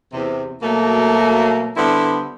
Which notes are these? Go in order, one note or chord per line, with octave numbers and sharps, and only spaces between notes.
E2 C3
B2 F#3 A3 A#3
D3 G3 B3 E4 C5